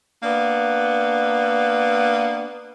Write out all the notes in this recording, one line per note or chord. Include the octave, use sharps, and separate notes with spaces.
A#3 B3 D4